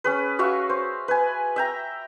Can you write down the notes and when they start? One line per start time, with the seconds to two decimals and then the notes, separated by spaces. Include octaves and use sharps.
0.04 C#4 G#4 B4
0.39 F#4 E5 F5 C#6
0.69 C5
1.08 B4 G#5
1.56 E5 G5 A#5